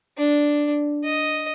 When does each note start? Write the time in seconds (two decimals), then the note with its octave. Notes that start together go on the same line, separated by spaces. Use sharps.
0.17 D4
1.03 D#5